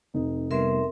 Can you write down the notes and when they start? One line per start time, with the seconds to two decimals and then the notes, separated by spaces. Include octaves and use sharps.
0.14 F1 D#4
0.51 C3 G3 B3 A#4 E5 C6